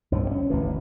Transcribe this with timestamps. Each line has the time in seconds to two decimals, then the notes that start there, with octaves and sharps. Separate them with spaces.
0.12 C2 G2 F3
0.31 C#4
0.50 G#1 D2 B2 E3